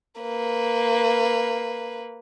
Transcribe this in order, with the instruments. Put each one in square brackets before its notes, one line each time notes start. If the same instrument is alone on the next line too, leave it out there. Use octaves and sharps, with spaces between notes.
[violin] A#3 B4